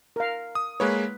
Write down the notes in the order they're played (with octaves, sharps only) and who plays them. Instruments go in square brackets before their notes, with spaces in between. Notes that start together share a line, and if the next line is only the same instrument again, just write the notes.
[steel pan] A#4 F5
[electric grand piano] D#6
[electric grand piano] G#3 A#3 C#5 [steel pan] B4